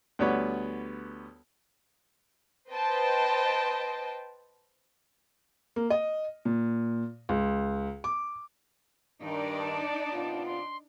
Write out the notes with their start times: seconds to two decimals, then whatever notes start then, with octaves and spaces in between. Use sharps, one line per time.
0.19 D2 G3 B3 B4 C#5
2.70 B4 C5 D#5 G5 A5
5.76 A#3
5.90 D#5
6.45 A#2
7.29 C#2
8.04 D6
9.22 G2 D#3 D4 D#4 D5
9.59 A5
10.13 C3 B3 F4
10.46 C6